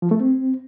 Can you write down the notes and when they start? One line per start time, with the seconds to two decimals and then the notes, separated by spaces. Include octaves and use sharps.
0.02 F3
0.11 A3
0.20 C4